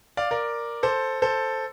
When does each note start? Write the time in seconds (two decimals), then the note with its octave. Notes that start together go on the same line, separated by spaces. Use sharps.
0.17 D5 F5
0.31 A#4 D5
0.83 A4 C5
1.22 A4 C5